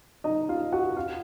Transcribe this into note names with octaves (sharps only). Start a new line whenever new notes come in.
D#4 D#5
F4 F5
F#4 F#5
F4 F5